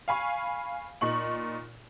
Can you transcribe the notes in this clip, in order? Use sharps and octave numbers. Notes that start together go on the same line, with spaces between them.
F5 G#5 B5 C#6
A#2 D#4 C#6 F#7